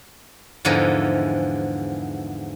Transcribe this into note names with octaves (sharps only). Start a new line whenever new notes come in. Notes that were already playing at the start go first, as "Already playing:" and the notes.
E2 G#2 D3 E3 F3 D#5